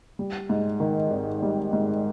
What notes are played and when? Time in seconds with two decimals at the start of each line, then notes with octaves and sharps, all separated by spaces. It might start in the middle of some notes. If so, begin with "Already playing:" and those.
0.19 G3
0.49 G#2
0.80 D#3
1.10 G#1
1.42 G3
1.73 G#2